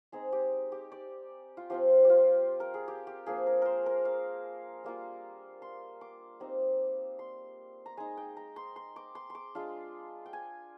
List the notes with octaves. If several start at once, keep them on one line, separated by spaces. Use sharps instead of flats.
G#3 C4 D#4 G#4
G4
G4
D5
F4
F3 C4 F4 G4
F4 G4
A#4
G#4
G4
G4
F3 A#3 D4 G#4
A#4
A#4 C5
A#4
F5
G3 A#3 F4
C6
D6
G3 C4 D#4
C6
A#5
G#3 D#4 G#5
G5
A#5
C6
C6
D6
C6
C6 D6
G#3 D4 F4
G5
G#5